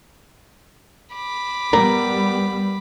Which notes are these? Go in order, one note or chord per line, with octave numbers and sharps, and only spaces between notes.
B5 D6
G3 B3 A#4 D5